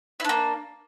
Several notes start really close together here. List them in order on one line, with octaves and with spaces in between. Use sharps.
E4 D4 A#3